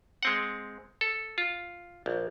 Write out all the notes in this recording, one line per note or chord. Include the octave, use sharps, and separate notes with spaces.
G#3 C4 F#5
A4
F4
A#1